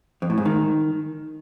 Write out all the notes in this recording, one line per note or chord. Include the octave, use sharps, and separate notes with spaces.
F2
A2
G#2
D#3